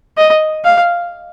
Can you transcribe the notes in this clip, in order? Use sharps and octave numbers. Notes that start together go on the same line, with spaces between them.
D#5
F5